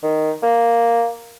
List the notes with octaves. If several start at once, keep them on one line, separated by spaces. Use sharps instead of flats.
D#3
A#3